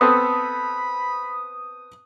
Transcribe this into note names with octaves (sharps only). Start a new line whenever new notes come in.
B3 C4 A4 B5 D#6